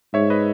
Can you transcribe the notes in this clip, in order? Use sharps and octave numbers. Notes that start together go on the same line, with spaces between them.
G#2 C#5 E5
B4 D#5